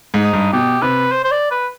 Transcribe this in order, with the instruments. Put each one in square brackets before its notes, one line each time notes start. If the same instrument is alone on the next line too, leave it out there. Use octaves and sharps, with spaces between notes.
[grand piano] G#2
[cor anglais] D#4
[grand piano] G2
[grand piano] B2 [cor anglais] G4
[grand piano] C3 [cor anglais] B4
[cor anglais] C5
C5
D5
B4